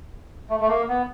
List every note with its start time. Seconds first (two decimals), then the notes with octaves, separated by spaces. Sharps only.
0.50 A3
0.60 A3
0.69 A#3
0.89 B3